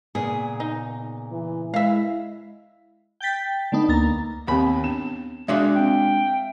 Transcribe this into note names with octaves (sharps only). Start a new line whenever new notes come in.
A#2 C#3 B3 G#4
D#4
E3
G#3 E4 E5 F5
G5 G6 A6 B6
D3 A3 B3 D#4
D2 A#3 A#5 A6
D#2 B3 C4 G4 B5
B3 D4 E7
G#3 D4 F#4 D5 E5 F5 C6
C4 G5